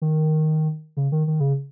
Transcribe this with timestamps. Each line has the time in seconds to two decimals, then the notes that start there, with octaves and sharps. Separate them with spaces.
0.02 D#3
0.97 C#3
1.12 D#3
1.27 D#3
1.40 C#3